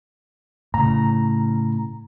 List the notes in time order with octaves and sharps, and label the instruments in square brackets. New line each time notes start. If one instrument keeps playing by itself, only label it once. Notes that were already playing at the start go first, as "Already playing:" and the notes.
[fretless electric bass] A2 C#3 [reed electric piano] A#5